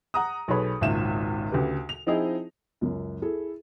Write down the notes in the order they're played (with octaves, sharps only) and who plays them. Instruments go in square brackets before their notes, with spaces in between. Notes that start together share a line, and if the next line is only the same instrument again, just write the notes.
[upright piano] F#5 A#5 D#6
B1 G#4 A4 B4 C#5 B5
G#1 C#2 A#2 E5 E7
D2 C#3 G4 B4
F7
F3 C4 D#4 E4 G#4 D#5
[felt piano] C#2 F#2
E4 G#4 A4